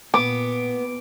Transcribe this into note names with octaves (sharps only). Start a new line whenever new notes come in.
A#2 B3 D6